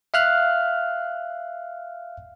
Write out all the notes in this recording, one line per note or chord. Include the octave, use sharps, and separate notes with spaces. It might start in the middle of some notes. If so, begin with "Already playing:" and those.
E5 F5 F6 F#6